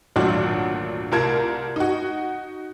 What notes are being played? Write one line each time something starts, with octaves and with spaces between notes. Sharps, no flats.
G#1 D2 A#2 F#3 D4 F#4
C2 F4 A#4 A5 G#6
D#4 F#4